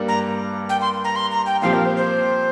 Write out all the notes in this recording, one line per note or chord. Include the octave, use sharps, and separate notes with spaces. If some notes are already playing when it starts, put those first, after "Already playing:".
Already playing: G2 G3 A#3
A#5
G5
C6
A#5
C6
A#5
G5
A#2 F3 C4 G4 F5
A#4
C5
C5